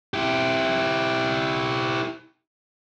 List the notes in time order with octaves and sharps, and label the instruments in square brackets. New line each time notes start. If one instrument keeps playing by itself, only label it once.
[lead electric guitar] E4 G4